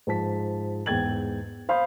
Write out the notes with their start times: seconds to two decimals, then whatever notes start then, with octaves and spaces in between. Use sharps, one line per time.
0.07 G#2 F3 A5 B6
0.86 E2 G#2 G5 G#6 A6 F#7
1.69 C5 F5 B5 D#6 G6